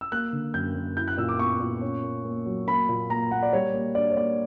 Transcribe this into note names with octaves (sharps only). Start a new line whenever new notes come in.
E6
A#3 F#6
D3
F#2 G6
F#2
E4 G6
F#6
A#2 E6
D6
B3 C#6
A#2
C#4
A#3
A#3
F#3
A#3 B5
A#2
A#3 A#5
A#3 F#5
D5
G3 C#5
A#3
D4 D5
C#5
A#3 D5